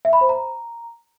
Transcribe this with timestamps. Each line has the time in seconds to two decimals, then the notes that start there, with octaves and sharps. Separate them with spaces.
0.05 E5
0.13 B5
0.21 C5
0.29 A#5